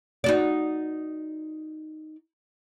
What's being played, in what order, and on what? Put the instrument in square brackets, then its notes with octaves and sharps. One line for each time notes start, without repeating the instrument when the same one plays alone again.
[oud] D#4 F#4 D5